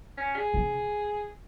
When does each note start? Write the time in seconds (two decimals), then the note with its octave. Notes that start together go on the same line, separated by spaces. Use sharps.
0.17 C#4
0.36 G#4
0.54 C#3